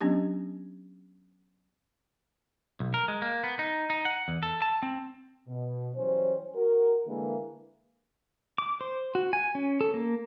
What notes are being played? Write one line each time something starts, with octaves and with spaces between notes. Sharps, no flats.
F#3 B3 C#4 D4 G4
B1
A#4
G#3
A#3
B3
D#4
D#4
F#5
E2
A4
A5
C4
B2
E3 F#3 G3 C#4 C5
F#4 A#4
D3 E3 G#3 A#3
D6
C5
F#4
G#5
C#4
A4
A#3